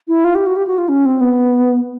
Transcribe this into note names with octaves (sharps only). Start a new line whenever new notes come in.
E4
F4
G4
F#4
G4
F#4
F4
C#4
C4
B3